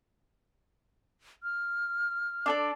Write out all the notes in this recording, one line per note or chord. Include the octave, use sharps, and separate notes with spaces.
F6
D4 A4 D5